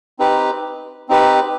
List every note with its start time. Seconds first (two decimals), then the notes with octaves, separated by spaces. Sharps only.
0.19 C4 D#4 G4 B4
1.09 C4 D#4 G4 B4